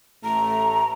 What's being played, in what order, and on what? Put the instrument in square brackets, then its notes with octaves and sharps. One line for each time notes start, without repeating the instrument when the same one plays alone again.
[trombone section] A1 A2 A3 [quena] A#5